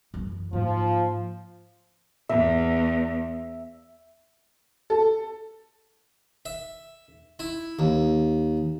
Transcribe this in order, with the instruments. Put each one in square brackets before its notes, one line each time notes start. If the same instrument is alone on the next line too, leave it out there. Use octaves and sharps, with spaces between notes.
[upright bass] F#2 E3
[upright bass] G#2 A#3 [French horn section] F3
[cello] E2 [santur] E5
[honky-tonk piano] A4
[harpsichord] E5
E4
D#2